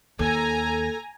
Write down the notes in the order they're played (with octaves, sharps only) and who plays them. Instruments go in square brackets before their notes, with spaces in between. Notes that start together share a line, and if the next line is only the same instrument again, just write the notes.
[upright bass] D#2 [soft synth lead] A4 [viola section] G#5 A#5